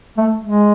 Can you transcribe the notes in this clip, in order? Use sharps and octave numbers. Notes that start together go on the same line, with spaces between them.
A3
G#3